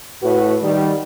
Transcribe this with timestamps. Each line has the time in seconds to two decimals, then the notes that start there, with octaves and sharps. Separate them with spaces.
0.23 A2 F#4 B4
0.63 D#3 G3